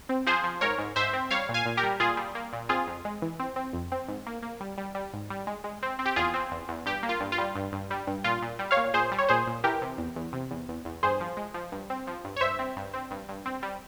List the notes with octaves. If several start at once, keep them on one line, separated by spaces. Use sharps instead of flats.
C4
F3 G#4 C5
F3
G#2 A#4 C#5
G#2
G#2 C5 E5
C4
G3 C#5 F5
A#2
F5 G#5
A#2
G4 A#4
G3
A#2 F4 G#4
G3
A#3
A#2
C4 F4 G#4
F2
G#3
E3
C4
C4
F2
C4
G#2
A#3
A#3
G3
G3
G3
G#2
G3
G#3
G#3
C4
C4
G4
E2 F4 G#4
C4
E2
E2
G2 G4
A#3
F4
G2
F4
G3
G2
G2
G3
G2
A#2 F4
A#2
G3
C#5 F5
A#2
A#2 G#4 C5
G3
C#5
A#2 G#4 C5
A#2
E3 G4 A#4
C3
E2
E2
C3
E2
E2
E2
G2 G#4 C5
F3
G#3
F3
G2
C4
F3
G2
C#5
G2 C5 E5
C4
G2
C4
G2
G2
C4
G3